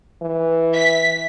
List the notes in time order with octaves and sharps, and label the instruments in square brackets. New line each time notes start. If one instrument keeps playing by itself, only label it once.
[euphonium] E3
[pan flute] E5 [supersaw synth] B6